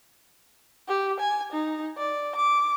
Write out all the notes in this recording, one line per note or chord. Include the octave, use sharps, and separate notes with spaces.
G4
G#5
D#4
D5
D6